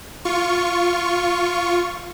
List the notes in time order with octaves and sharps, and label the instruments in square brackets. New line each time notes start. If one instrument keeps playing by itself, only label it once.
[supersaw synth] F4 C#6